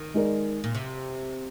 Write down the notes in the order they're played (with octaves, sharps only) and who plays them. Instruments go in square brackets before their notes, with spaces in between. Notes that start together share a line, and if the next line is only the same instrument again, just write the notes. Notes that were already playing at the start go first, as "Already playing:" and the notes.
Already playing: [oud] D#3
[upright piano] G#3 D#4 A#4 D5
[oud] A#2
C3